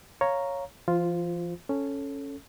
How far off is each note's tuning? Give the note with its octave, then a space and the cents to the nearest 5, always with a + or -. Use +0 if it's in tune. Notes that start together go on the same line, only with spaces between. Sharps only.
C#5 +0 F5 +0 A#5 +0
F3 -40 F4 +0 C5 -10
C#4 +0 A4 +0